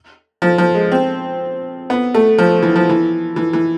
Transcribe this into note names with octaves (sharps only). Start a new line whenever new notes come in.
F3
F3
G#3
C4
B3
A3
F3
E3
F3
E3
E3
E3